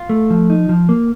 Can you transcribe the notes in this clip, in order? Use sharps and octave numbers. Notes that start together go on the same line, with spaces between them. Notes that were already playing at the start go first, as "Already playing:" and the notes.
Already playing: F4
A3
F3
D#4
F3
A#3